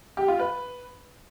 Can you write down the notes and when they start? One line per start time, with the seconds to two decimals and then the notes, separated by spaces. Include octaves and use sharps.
0.17 G4
0.28 F4
0.39 B4